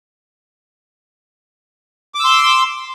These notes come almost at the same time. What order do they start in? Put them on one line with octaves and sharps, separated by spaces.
D6 E6 C6